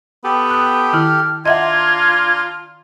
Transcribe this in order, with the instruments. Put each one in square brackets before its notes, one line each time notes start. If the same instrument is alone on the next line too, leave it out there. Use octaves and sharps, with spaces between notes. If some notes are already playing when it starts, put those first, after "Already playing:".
[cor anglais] B3 [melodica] G4 A4 G5
[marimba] D#6 F#6
[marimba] D#3 E4 [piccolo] F6
[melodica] D4 A#5 C6 [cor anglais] F4 [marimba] D#5 E5 F#5 [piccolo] G#6